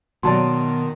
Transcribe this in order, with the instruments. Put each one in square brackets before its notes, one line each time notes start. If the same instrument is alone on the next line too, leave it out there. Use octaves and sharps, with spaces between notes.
[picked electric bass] B2 [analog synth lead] D#3 [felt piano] F#3 C#5 D5 [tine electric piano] A5 C6